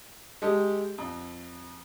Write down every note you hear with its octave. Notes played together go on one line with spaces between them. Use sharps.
G#3 G4 A4
F2